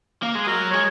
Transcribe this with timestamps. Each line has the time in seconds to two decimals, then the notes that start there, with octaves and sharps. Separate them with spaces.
0.23 A#3
0.35 G#3
0.44 G#4
0.47 F#3 A#4
0.71 G#3 C#5